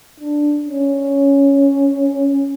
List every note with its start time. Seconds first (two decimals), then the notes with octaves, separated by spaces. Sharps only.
0.20 D4
0.65 C#4